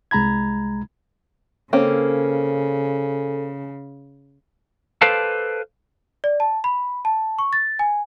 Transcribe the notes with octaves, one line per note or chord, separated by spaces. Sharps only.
C2 G#3 A#5 B5 G#6
C#3 A#3 C4 C#4 A4
A4 B4 C5 D5 F5 A5
D5
A5
B5
A5
C#6
A6
G#5